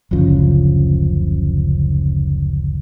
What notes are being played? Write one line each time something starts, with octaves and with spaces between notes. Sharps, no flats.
F#1 D2 C#3 F3